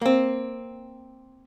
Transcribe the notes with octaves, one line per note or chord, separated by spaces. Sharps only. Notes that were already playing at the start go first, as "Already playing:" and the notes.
A#3 C4